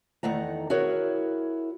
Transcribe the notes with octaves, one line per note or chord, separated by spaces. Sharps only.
E2 D#3 A3 F#5 A#5
E4 F#4 G#4 A#4 C#5